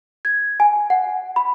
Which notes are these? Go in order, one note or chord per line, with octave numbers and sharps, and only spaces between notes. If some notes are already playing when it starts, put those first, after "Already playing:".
G#6
G#5
F#5
B5